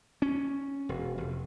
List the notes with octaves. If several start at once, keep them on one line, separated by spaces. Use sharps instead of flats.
C#4
E1
F1